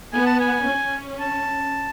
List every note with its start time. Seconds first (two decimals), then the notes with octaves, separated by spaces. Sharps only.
0.13 B3 G#5
0.26 A5
0.40 G#5
0.66 C#4
1.20 A5